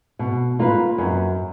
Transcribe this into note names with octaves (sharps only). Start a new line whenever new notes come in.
B2
A#3 F4 B4
F#2